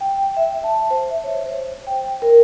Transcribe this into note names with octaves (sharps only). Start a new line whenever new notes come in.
G5
E5
A5
C5
E5
C#5
C5
G5
A#4